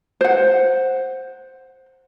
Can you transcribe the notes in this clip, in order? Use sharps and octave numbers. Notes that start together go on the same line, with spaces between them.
C5 F#5